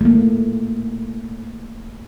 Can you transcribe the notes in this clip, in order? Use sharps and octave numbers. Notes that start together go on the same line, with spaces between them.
A3 A#3